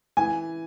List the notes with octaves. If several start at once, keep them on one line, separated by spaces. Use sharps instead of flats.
E3 G#5